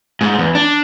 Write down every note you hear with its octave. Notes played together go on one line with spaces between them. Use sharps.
G#2
E2
D4